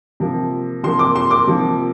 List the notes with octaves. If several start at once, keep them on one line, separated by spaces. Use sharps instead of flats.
C3 F3 A#3
C3 F3 A#3 C6
D6
C6
D6
C3 F3 A#3